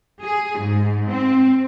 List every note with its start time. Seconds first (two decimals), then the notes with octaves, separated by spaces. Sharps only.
0.24 G#4
0.59 G#2
1.09 C4